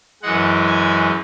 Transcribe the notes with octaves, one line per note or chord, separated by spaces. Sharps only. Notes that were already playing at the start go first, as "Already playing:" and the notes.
F#2 E3 G#3 F#5
G#5